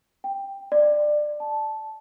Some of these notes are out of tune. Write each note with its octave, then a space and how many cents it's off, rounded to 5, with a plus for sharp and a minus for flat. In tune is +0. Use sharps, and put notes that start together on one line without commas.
G5 +10
D5 +20
A5 -10